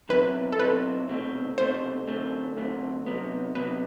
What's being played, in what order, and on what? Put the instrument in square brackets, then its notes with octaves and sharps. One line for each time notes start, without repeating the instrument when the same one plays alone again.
[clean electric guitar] B2 F#3 C4 E4 [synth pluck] B4
[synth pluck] A4
[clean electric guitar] B2 F#3 C4 E4 [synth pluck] B4
[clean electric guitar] C2 B2 A3 C4
[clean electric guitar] C2 B2 A3 C4 [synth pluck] C5
[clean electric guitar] F#2 D3 A3 C4
F#2 D3 A3 C4
C3 F#3 B3
[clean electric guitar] C3 F#3 B3 [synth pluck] B4